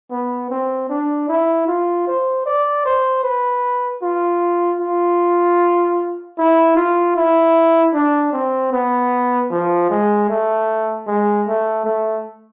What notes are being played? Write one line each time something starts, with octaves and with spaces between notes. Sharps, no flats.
B3
C4
D4
E4
F4
C5
D5
C5
B4
F4
F4
E4
F4
E4
D4
C4
B3
F3
G#3
A3
G#3
A3
A3